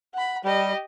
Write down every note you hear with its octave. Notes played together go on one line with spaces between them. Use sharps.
F#5 B5
G3 G4 D#5